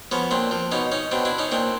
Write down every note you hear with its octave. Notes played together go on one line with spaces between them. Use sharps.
F3 B3 C#4
A#2 C4 D4
F3
B2 C#4 D#4
C#4 D#4
B2 C4 D4
D4 E4
C#4 D#4
A#2 C4 D4